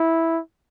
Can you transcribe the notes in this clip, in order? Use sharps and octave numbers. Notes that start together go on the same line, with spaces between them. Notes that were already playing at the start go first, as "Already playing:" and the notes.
Already playing: E4